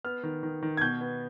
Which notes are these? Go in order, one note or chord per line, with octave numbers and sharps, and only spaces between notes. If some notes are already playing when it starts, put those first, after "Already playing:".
B3 F6
D#3
D#3
D#3
G#6
B2 G6
B3